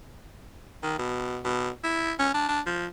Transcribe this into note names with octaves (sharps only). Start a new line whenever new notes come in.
D#3
B2
B2
E4
C#4
D4
D4
F3